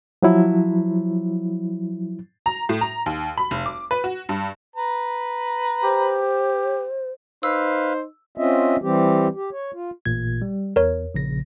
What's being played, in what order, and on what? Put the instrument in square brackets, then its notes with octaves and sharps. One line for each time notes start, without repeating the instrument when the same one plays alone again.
[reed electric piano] F3 F#3 E4
[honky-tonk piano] A#5
A2
A#5
D#2
B5
F1
D6
B4
F#4
G2
[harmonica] B4 A#5
[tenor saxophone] G4 [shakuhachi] C5
[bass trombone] D#4 [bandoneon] B4 F5 [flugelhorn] C5 [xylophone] E6
[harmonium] C4 C#4 F4 D#5 E5
E3 G3 C4 G4
G4
C#5
F4
[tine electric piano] A1 A#2 G#6
G3
[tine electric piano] E2 [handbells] A#4 C#5
[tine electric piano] A#1 C#3 A#6